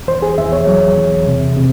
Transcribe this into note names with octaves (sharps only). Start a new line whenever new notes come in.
E2 C5
G#4
E2 E5
C#5
F#3
E2
C3
C3